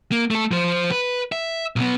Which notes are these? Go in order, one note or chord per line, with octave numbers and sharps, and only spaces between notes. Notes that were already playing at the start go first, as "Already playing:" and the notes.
A#3
A3 A4
F3 C5
B4
E5
B1 B3